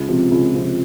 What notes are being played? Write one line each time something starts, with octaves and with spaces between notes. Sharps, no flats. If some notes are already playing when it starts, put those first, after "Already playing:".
Already playing: C#2
C3 F3
C#2
C3 F3